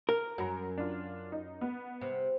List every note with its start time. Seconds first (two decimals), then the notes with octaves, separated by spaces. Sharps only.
0.09 A#4
0.38 F#2 F#3 A#5
0.78 D4 F4
1.32 D#4
1.61 B3
2.01 C3